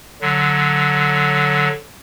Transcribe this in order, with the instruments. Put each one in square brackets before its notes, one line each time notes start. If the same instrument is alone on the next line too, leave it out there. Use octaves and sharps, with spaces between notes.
[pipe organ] D3 F#3